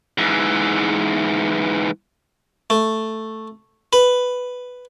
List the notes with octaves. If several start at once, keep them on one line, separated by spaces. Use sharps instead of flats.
G#2 E3
A3
B4